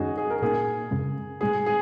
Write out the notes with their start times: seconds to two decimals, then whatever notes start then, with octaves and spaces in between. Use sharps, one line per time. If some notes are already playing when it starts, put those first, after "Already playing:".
Already playing: F#2 D#3 G#3 C#4 D#4 F#4 G#4
0.18 G#4
0.30 A#4
0.42 A#2 A#3 D#4 G#4
0.91 F#2 C#3 G#3 C#4
1.41 A#2 G#3 D#4 G#4
1.66 G#4